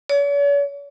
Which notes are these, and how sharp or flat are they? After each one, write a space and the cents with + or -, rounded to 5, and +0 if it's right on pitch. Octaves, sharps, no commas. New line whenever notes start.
C#5 +45